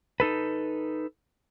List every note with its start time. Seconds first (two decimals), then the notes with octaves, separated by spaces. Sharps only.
0.20 D#4 A4 B4